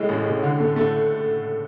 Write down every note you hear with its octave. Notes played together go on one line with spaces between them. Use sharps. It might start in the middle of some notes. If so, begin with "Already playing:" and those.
Already playing: A2 G#3
A1
A2
D3
A3
A3